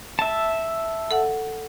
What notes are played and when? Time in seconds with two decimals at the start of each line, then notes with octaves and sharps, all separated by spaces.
0.19 E5 A5
1.11 A4 F#5